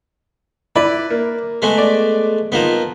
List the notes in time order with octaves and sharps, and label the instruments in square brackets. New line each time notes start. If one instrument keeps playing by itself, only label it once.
[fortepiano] E4 D5 B5 [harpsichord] B4
[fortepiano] A#3
[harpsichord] G#3 A3 B3
[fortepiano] D5
[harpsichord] F3 A#3 B3 [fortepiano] D#4